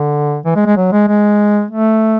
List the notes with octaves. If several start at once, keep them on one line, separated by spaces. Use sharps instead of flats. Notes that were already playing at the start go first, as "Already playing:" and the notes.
Already playing: D3
E3
G#3
G#3
F#3
G#3
G#3
A3